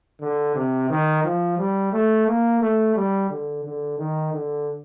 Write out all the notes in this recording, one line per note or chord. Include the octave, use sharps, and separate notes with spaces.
D3
C3
D#3
F3
G3
A3
A#3
A3
G3
D3
D3
D#3
D3